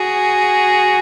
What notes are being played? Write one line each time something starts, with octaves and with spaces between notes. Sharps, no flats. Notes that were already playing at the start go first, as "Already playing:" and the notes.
Already playing: F#4 G#4